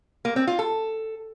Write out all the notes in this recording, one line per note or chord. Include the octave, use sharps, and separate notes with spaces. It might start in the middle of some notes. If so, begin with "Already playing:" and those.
A#3
C4
F4
A4